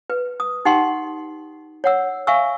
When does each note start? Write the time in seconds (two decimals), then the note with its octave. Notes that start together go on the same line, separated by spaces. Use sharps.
0.10 B4
0.40 D#6
0.65 D#4 G4 F#5 G5 C6
1.84 C#5 F#5 E6
2.27 E5 F5 G#5 C#6 E6